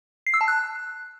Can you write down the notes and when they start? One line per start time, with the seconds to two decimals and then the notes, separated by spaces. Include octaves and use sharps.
0.27 C7
0.34 E6
0.41 A5
0.48 F#6